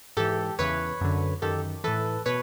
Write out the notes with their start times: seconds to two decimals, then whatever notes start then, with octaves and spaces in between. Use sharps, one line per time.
0.17 G#2 E3 G4 A4
0.59 E2 C#3 E3 B4 C#5
1.01 F#2 D3
1.42 F#2 D#3 G4 A4
1.84 A2 E3 A4 B4
2.26 B2 B4 C#5